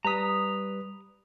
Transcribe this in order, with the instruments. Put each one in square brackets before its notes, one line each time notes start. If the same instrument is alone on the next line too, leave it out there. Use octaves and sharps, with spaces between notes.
[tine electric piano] G3 B4 B6 [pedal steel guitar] A#5 D#6